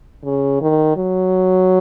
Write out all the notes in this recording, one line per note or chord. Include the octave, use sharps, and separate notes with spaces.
C#3
D#3
F#3